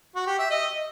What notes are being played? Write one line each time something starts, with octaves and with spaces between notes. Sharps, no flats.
F#4
G4
E5
D#5